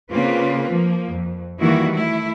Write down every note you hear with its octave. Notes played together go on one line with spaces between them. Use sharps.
C#3 A#3 C4 F4 B4
F3 A#3
F2
D#3 E3 G3 A#3 E4 F#4
A3 E4